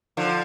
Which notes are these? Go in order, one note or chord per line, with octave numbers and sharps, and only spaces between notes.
D3 F3